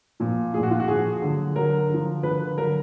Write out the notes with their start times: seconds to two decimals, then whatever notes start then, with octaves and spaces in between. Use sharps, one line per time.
0.20 A#2 F3
0.54 F3 G#4
0.58 A#2
0.63 F#4
0.71 F4
0.80 F#4
0.88 A#2 F3 G#4
1.22 D3 F#3
1.56 D3 F#3 A#4
1.89 D3 F3
2.23 D3 F3 B4
2.57 F#3 A#4
2.61 D3